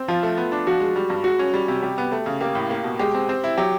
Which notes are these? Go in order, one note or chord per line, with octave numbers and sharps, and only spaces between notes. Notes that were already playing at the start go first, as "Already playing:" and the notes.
Already playing: C4
F3 F4
A3
B3
D4
F3 F#4
G#3
G3
G2
G#3 F#4
C#4
G3
C3
G3 G4
B3
A3
C#3
A#3 G4
A2
A#3
B2
G#3 G4
C4
C4
E4
F#3 G4